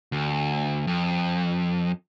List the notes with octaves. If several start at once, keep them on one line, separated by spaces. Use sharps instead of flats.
D2
F2